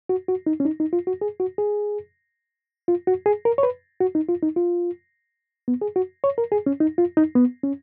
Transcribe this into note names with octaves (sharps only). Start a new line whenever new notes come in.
F#4
F#4
D#4
C#4
D#4
D#4
F4
F#4
G#4
F#4
G#4
F4
F#4
G#4
A#4
C#5
B4
F#4
D#4
F4
D#4
F4
B3
G#4
F#4
C#5
A#4
G#4
C#4
D#4
F4
D#4
B3
C#4